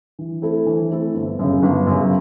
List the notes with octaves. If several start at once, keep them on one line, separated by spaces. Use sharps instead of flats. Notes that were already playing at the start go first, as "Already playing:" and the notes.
E3
A3 C4 E4 A4
E3
A3 C4 E4 A4
G1
F#2 C#3
G1
F#2 C#3